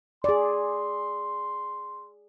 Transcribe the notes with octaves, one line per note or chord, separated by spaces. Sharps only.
G#4 D5 C6